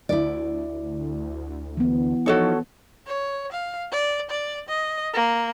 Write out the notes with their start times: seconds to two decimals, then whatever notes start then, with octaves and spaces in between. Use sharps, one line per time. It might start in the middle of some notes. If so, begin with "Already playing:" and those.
0.09 D2 E4 D5
1.77 E3 B3
2.26 F3 D#4 F#4 A4 C#5
3.07 C#5
3.52 F5
3.92 D5
4.30 D5
4.69 D#5
5.14 A#3